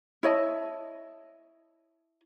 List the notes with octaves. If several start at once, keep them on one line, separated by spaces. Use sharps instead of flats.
E4 C#5 D#5 A5